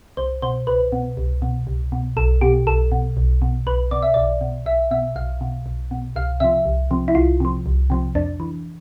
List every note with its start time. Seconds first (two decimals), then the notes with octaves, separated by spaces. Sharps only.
0.17 C2 C5
0.42 B2 C5
0.67 C2 B4
0.92 B2
1.17 C2
1.42 B2
1.67 C2
1.92 B2
2.17 B1 A4
2.41 B2 G4
2.67 B1 A4
2.92 B2
3.17 B1
3.42 B2
3.67 B1 B4
3.91 B2 D5
4.03 E5
4.14 B1 D5
4.41 B2
4.66 B1 E5
4.91 B2 E5
5.16 B1 F5
5.41 B2
5.66 B1
5.91 B2
6.16 C2 F5
6.40 C3 F3 E5
6.65 C2
6.91 C3 F3
7.08 E4
7.15 C2 F4
7.40 C3 F3
7.66 C2
7.90 C3 F3
8.15 F2 D4
8.40 E3